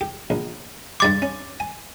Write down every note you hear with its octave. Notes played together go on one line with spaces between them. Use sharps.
G4
A#1
G2 G3 C6 D6 A6
C#4
G#5